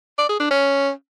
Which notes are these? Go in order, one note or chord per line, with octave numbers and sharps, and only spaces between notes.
D5
G#4
D4
C#4